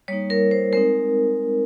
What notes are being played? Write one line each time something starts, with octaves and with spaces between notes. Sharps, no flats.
G3 A#3 D#4 C#5
A#4
C5
G#3 C4 D#4 A#4